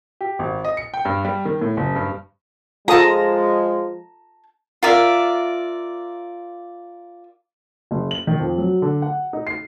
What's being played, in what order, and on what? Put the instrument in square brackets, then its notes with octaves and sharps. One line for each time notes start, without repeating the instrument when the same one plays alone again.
[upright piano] G4
G#1
D#5
C#7
G5
G2
G3
D#3
A2
F#1
G2
[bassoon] F3 [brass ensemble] G#3 [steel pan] F4 A4 D#6 [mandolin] A5 A#5
[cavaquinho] F4 A#4 D5 E5
[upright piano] F#1
F#7
D#3
F2
F#3
D3
F#5
D#4
C7